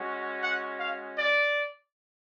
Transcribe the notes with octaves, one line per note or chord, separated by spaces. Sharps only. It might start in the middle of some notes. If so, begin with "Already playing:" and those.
Already playing: G#3 C#4 F#4
F#5
F5
D5